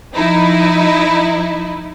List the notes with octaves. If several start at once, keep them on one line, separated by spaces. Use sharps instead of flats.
F3 D#4 E4